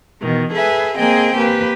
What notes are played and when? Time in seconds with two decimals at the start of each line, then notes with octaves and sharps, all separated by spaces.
0.21 B2 D#3 E3
0.52 G#4 A4 B4 E5 G#5
0.98 A#3 C4 G#4 D#5 G5 G#5
1.36 A#3 G4 B4